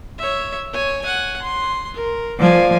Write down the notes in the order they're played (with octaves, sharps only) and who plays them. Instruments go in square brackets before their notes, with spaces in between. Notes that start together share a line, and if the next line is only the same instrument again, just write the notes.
[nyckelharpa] C#5 E5
C#5 G#5
F#5 G#5
C6
A#4
[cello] F3 [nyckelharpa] D5 G#5